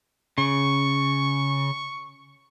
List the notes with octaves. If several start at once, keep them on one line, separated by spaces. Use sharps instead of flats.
C#3 C#6